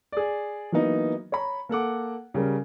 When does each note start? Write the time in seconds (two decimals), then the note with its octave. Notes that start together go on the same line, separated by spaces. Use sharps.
0.12 G#4 D5
0.72 E3 F#3 A#3 B3 D#4
1.32 C#5 A#5 B5
1.69 A#3 A4 F#5 D6
2.34 C#3 G3 A#4